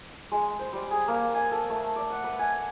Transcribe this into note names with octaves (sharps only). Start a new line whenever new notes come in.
G#3
C5
G3
G#4
A#3
G#5
A4
A3
D5
F#5
B4
G#5